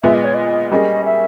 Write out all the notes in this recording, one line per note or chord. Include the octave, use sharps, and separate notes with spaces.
A#2 G#3 B3 E5
D#5
C#5
D#5
G3 A#3 C#4 G#4 D#5
E5